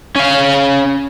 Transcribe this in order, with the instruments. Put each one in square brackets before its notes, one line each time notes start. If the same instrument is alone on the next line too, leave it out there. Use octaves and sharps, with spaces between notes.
[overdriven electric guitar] C#4 F5